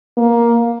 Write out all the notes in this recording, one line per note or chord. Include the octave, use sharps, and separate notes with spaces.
A#3